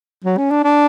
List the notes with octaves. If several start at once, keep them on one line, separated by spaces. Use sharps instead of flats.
F#3
C#4
D4
D4